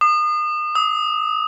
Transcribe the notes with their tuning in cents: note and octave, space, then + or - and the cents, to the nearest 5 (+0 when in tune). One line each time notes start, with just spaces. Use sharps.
D#6 -35
D#6 +40